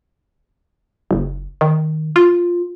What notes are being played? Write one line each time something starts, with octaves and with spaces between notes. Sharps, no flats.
F#1
D#3
F4